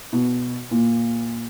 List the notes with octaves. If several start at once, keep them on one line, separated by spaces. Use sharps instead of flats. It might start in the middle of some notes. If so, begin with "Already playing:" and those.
B2
A#2